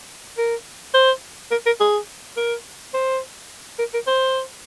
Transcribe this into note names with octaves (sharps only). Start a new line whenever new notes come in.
A#4
C5
A#4
A#4
G#4
A#4
C5
A#4
A#4
C5